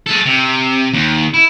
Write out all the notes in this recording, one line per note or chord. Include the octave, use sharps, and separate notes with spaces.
G#3 A4
C3
D#2
E4